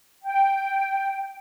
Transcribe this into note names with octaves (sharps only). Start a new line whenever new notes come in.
G5